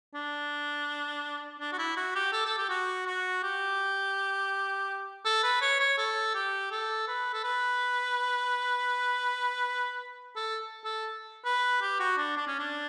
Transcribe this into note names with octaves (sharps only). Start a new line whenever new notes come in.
D4
D4
F#4
E4
F#4
G4
A4
A4
G4
F#4
F#4
G4
A4
B4
C#5
C#5
A4
G4
A4
B4
A4
B4
A4
A4
B4
G4
F#4
D4
D4
C#4
D4